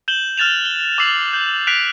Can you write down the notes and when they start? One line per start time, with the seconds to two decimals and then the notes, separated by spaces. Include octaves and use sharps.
0.08 G6 E7 F#7 G7
0.38 F6 F#6 A6 E7 F7
0.65 G7
0.98 D6 E6 C7 F#7
1.33 G6
1.67 F#6 B6 C7 D7 F7